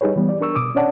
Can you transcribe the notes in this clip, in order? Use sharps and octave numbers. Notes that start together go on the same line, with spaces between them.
G3 D#4 G4 G#4 B4 C#5
E3 G3 B3
D5
D4 A#4 C#6 E6
B2 D6 D#6
C#4 D4 C#5 D5 F#5 A5